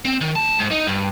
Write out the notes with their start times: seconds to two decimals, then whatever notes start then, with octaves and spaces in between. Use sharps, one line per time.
0.05 C4
0.21 D#3
0.36 D2 A5
0.58 G#2
0.71 D#4
0.87 G2